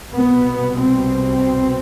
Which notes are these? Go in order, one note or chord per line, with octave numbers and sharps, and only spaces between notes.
C2 B2 B3
C4